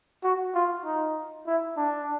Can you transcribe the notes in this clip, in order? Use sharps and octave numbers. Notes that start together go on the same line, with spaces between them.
F#4
F4
D#4
E4
D4